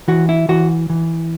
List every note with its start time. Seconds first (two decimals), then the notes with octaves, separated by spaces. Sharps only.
0.08 E3 F#4
0.29 E4
0.49 E3 F#4
0.90 E3